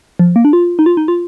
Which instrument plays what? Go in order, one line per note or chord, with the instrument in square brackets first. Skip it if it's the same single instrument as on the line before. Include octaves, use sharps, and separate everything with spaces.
[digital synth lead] F3
A#3
D4
F4
D#4
F4
D#4
F4